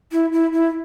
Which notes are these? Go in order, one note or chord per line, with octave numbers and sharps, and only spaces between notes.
E4
E4
E4